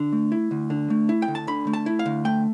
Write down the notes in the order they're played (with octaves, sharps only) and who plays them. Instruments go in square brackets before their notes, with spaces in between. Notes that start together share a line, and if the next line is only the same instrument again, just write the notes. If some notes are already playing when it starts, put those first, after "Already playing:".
Already playing: [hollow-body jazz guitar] D3
A3
E4
D2
D3
A3
E4
G5
D2
A5
D3 B5
A3
A5
E4
F5
D2
A3 G5